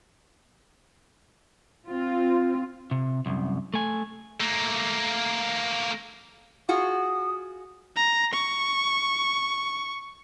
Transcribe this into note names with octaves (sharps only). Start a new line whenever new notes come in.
C4 F4
C3
C2 F#2
A3 G#5
A3 A#3
F4 F#4 G#4 D#6
A#5
C#6